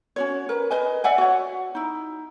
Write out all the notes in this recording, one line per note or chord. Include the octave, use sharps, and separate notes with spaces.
C#4 F#4 C#5
A#4 B4
B4 D#5 G#5
D5 E5 F#5 G#5
F#4 C#5
D#4 E4